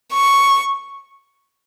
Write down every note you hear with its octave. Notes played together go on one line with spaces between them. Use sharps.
C#6